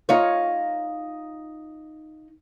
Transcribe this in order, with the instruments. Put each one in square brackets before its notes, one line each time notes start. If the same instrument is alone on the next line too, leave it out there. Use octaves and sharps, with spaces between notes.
[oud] D#4 F4 C#5